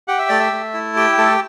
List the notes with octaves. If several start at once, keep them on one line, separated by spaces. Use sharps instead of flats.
G4 F#5
E5
A3 D5
E5
A3
E4
G4 G5
A3 A4